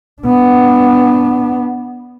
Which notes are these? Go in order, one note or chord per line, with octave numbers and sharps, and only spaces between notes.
B3 D4